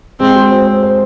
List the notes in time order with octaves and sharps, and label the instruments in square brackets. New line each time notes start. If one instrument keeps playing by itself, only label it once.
[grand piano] G#3 [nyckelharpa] C4
[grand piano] F#4
C5
C5
C5